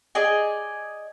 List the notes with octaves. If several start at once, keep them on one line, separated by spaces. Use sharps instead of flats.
G#4 D5 D#5 G#5